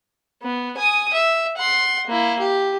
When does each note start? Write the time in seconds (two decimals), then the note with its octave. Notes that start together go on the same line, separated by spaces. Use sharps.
0.43 B3
0.77 G#5 D#6
1.13 E5
1.57 F#5 C6
2.07 A#3 E4
2.40 G4